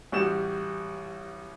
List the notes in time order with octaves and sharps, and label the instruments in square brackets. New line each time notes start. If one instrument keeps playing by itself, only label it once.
[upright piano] A1 G3 F#4 E7